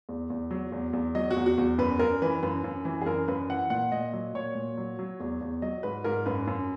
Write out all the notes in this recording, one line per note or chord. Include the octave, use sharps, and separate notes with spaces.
E2
E2
F#3
E2
E2
F#3 D#5
F#4
E2
F#4
E2
F#2 B4
F#2 A#4
E3 B4
F#2 B4
F#2
E3
G#4
F#2 A#4
F#2 B4
E3 F#5
A#2 F#5
A#2 D#5
F#3 D#5
A#2 C#5
A#2
F#3
F#3
E2
E2
F#3 D#5
G#2 B4
G#2 A#4
F#2 B4
F#2